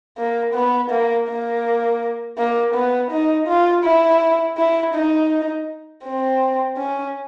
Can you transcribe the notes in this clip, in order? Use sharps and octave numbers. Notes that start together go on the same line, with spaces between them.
A#3
B3
A#3
A#3
A#3
B3
D#4
F4
E4
E4
D#4
C4
C#4